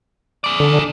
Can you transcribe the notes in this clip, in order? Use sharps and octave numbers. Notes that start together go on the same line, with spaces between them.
G#4 D5
D3